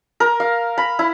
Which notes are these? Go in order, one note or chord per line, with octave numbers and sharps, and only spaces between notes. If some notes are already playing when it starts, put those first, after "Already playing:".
A#4
F5
B5
E4